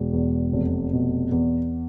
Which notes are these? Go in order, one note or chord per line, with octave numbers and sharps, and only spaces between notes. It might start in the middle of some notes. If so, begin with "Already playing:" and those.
Already playing: E1
E2
F1
B2
E2